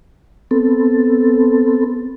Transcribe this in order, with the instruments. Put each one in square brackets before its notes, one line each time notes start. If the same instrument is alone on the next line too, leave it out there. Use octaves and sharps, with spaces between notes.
[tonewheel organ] B3 C4 A4